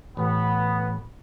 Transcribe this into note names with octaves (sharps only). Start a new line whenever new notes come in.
A1 B3